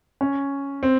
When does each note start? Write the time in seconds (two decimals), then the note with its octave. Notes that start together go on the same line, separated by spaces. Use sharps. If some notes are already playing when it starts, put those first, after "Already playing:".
0.21 C#4
0.83 C4